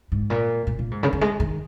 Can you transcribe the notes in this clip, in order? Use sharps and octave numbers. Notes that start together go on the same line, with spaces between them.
G#2
A#2
A#2
A#2
G#2
C#3
D#3
G#3
D#3